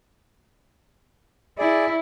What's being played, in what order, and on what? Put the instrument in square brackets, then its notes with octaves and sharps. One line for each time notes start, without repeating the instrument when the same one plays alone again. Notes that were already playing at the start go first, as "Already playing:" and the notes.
[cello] E4 [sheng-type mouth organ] G#4 D5